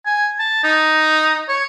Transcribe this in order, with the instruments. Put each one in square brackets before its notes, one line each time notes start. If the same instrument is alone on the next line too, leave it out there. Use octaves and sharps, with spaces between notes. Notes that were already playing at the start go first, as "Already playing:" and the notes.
[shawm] G#5
A5
D#4
C#5